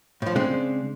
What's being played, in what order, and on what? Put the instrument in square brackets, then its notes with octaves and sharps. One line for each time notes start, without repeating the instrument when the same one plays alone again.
[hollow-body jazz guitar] A2 F3
[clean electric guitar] C#3 G#3 D4 [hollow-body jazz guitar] C4